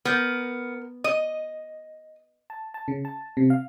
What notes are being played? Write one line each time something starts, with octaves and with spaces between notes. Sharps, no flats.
B3 A#4 G6
D#5 D#6
A5
A5
C#3
A5
C3
F5